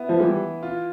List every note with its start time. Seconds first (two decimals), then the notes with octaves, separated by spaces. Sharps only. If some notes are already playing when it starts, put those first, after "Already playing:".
Already playing: B3 E4
0.09 F3
0.20 E3 G3
0.63 F4